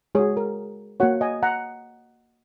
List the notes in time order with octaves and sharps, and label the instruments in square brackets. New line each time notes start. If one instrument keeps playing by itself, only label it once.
[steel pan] G#3 F#4 G#4 C#5
A#4
A#3 F#4 C#5 F#5
D#5 G#5
F#5 A#5